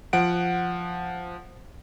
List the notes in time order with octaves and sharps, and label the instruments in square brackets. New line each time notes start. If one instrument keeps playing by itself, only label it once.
[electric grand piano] F3 F#5 D7